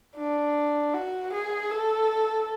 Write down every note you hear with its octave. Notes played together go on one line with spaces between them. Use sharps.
D4
F#4
G#4
A4